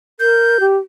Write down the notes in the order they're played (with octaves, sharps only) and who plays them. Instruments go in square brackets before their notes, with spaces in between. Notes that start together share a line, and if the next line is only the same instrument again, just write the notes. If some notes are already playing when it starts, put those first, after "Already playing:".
[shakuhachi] A#4 [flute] G6
[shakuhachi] G4